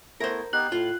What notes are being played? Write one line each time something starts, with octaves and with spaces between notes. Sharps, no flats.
A3 B3 E4 A#4 C5
B3 D#4 G4 F#6 F#7
A2 F4